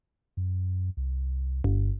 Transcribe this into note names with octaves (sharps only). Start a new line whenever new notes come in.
F#2
C2
G1